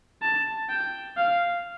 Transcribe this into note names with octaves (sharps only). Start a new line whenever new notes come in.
A5
G5
F5